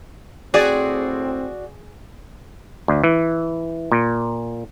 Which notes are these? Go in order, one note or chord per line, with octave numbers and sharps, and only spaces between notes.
A2 C4 F#4 G#4 D5
D2
E3
A#2